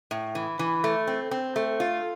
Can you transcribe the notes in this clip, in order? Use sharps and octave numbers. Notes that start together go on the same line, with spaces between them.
A2
E3
E3
A3
C4
C4
A3
F4